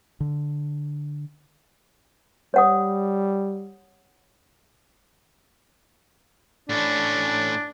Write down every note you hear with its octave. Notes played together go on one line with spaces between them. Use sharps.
D3
G3 C#5 F#5 D#6
A2 C#4 D4